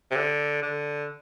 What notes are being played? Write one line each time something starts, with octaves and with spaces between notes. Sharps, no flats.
C3
D3
D3